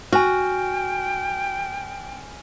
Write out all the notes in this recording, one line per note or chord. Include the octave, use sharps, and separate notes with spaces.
F#4 G5 G#5 F6